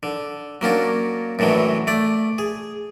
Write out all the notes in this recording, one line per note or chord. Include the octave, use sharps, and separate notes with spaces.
D3
F#3 A#3 C#4 D4
F#2 A2 D3 E3 F#3
A3 D5
G#4